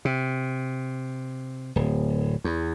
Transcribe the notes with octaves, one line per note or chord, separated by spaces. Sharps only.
C3
D1
E2